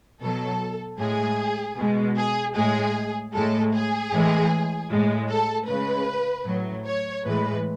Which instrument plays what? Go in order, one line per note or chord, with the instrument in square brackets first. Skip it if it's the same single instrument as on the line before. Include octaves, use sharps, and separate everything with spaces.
[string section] B2 F#3 A4
A2 G#3 G#4
B2 G#3
G#4
A2 G#3 G#4
A2 G#3 A4
G#4
A2 E3 G#3
A2 G#3
A4
C#3 G#3 B4
A2 F#3
C#5
A2 E3 G#3 B4